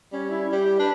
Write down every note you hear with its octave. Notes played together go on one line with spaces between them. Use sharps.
G3 C#4
E4
G3 G4
D4 B4